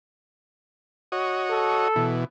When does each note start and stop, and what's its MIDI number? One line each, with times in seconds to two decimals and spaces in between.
1.12 1.88 66
1.12 1.88 73
1.12 1.88 75
1.50 2.16 69
1.96 2.24 47
1.96 2.24 52